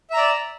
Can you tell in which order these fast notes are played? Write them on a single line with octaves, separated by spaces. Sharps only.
E5 A#5 D5